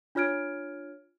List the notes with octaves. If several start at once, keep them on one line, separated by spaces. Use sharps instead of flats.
D4 F4 C#5 F6 G#6 D7